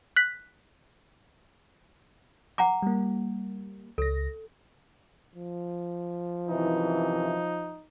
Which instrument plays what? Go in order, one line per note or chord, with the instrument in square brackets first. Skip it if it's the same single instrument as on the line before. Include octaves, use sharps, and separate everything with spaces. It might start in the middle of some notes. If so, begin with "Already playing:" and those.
[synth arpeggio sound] F#6 B6
[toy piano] F#5 A#5 D6
[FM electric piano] G3 A#3
[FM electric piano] C#2 A#6 [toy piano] A4
[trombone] F3
[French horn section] F#2 C3 E3 [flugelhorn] D#4